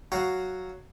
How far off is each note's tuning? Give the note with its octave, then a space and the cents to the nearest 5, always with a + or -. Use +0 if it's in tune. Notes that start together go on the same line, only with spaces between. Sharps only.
F#3 +0 F#4 +0 F5 +0